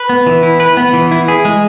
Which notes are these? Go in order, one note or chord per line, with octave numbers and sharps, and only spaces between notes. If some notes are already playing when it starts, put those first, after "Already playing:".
Already playing: B4
B3
E3
E4
B4
B3
E3
E4
G#4
G#3